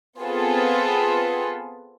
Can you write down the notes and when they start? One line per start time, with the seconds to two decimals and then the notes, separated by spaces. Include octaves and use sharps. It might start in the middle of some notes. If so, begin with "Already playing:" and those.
0.20 B3 C4 F4 G#4 A4 B4